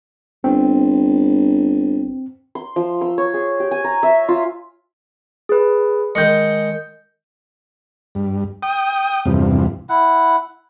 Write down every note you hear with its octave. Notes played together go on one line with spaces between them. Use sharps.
G1 C4
C6
F3
E6
C#5
G#4
G4
G#5
A#5
E5
F4
G#4 B4
D#3 G#3 G6 C#7
G2
G5 D#6
E2 G2 C3 F3
E4 F#5